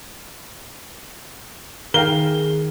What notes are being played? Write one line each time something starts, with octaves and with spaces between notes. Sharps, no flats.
D#3 G#4 A#4 F5 G5 G7